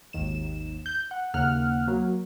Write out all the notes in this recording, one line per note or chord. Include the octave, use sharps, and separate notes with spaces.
G#1 D#2 D#3 E7
G6
F#5
D#2 C#3 A#3 F#5 F6 F#6
F#3 A#3